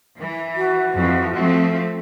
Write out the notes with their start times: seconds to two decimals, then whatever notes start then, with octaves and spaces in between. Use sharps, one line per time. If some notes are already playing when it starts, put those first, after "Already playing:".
0.19 E3
0.56 F#4
0.95 F2 E3 F3
1.35 F3 A3 C4